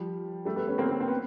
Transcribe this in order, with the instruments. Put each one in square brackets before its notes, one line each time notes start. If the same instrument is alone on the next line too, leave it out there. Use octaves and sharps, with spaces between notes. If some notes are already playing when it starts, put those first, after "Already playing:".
Already playing: [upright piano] F3 G3
G3 A3
A3 B3
B3 C#4
A#3 C4
A#3 C4
C4
B3